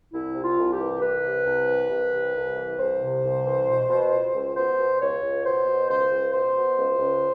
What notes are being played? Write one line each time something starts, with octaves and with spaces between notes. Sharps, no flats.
C2 E4
C3
F4
C2
G4
E3
C2 B4
C3
C2
E3
C2
C3
C2
E3
C2 C5
C3
C2
E3
B2
B2
C#2
C#2
B2 C5
B2
C#2 C#5
C#2
B2 C5
B2
C#2 C5
C#2
B2 C5
B2
C#2
C#2